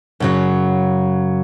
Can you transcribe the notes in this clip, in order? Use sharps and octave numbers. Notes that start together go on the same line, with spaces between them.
F#2 C#3 F#3